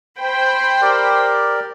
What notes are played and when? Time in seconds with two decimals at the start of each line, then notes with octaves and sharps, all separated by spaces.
0.19 C5 G5 B5
0.82 G4 A#4 D5